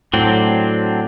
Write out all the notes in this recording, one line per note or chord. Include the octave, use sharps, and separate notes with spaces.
A2 F#3 C4 D4